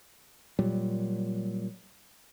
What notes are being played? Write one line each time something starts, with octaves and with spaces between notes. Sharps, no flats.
A#2 F#3 G3